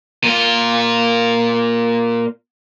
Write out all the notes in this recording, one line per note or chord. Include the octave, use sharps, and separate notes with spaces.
A#2 F4